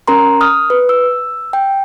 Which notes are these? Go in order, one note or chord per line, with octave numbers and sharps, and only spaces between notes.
C#4 A#4 A#5 C6
D#6 F6
B4
E6
G5